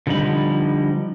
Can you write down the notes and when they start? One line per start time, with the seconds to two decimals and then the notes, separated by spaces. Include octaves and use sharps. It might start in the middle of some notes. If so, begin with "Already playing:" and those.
0.07 D3 F3 G3 D#4 B5